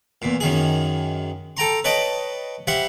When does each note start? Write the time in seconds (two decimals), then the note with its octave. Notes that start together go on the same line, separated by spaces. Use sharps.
0.22 E2 A#2
0.40 F#2 D#3 G#4
1.57 A4 G5 A#5 C6
1.84 B4 C#5 D#5 G5 A5
2.67 G3 C5 E5 F#5